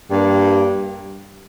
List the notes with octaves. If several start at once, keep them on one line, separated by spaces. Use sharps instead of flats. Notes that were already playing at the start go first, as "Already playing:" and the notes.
G2 G3 A#3